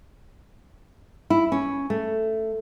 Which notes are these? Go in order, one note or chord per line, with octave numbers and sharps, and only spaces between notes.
E4
C#4
A3